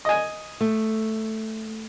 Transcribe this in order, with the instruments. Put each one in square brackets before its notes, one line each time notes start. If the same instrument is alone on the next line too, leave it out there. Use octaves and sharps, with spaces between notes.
[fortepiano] D#5 G#5
[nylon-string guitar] A3